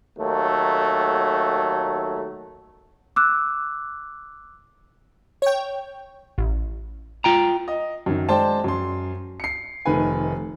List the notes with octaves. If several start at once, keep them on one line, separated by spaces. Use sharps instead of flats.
D#2 F#3 A3
D6 E6 F#6
C#5 G5
A1
F4 G5 A#5
D#5
F#2 D#3
G#3 C5 D5 G5 A5
F#2 C6
C7 C#7
F1 D#3 A3 B4 G#5